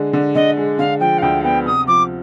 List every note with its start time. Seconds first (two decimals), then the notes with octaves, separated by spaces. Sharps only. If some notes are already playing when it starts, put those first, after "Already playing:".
Already playing: D3 G#3
0.13 D3
0.35 D3 D#5
0.57 G#3
0.79 D3 F5
1.00 F3 G5
1.18 F5
1.22 D2 G5
1.40 F5
1.44 B3 G5
1.66 C3 D#6
1.87 F3 D6